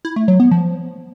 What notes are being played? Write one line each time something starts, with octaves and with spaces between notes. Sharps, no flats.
E4
A3
F#3
B3
F3